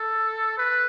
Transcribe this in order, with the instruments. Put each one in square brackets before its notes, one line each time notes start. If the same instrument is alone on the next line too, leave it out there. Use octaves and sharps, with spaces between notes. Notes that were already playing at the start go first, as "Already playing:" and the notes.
Already playing: [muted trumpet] A4
B4